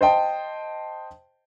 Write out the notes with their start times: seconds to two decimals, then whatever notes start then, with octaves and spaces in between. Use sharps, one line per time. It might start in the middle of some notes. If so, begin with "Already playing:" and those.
0.01 C5 D#5 G5 A5